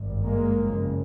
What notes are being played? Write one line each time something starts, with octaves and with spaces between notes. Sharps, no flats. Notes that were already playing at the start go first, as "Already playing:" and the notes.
Already playing: G#1 G2
G#3 A#3
F#1 F2 C#3